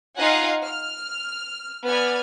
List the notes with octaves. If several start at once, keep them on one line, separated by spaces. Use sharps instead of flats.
D#4 F4 D#5 F5 F#5 G#5
F6
B3 D5 G#5 F6